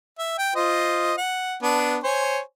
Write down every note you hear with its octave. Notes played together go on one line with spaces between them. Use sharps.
E5
G5
F4 C5 D#5
F#5
B3 D4
C5 C#5 G#5